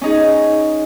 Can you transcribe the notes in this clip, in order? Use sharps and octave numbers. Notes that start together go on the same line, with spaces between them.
C#4 D#4 G#4